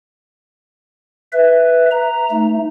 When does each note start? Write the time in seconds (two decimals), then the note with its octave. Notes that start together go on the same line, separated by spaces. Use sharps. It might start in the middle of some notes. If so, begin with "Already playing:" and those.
1.33 B4 E5
1.91 A#5
2.31 A3 D#4